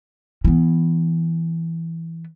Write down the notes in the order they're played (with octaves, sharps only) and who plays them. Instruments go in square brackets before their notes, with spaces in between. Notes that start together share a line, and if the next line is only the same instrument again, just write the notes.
[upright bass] E3 B3